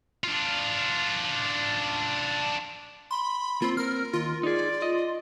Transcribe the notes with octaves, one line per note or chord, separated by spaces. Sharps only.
D4 F4
B5 C6
A#3 C4 F4
A#4 F6
D#2 F4
D#4 G#4 D5
D#5